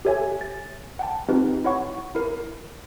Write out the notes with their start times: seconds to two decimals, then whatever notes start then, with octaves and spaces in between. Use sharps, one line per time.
0.05 G4 A4 C#5 E5 G#5
0.41 A6
0.99 F#5 G5 A5
1.29 C4 D#4 F4 G4 B4
1.64 E4 C#5 F#5 C#6
2.15 E4 A#4